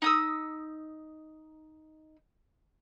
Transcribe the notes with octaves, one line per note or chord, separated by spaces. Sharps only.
D#4 D#6 E6